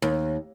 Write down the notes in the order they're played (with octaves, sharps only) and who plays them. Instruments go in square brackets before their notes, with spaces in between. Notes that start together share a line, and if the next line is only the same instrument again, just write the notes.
[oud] D#2